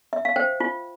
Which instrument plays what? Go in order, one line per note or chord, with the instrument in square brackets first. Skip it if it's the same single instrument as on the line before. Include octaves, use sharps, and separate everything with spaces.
[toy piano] E5
F5
C5 G5
F4